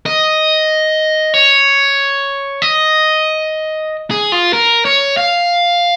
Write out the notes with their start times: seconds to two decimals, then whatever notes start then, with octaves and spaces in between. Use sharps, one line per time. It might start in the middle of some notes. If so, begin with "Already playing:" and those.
0.06 D#5
1.34 C#5
2.62 D#5
4.11 G#4
4.32 F4
4.53 A#4
4.85 C#5
5.17 F5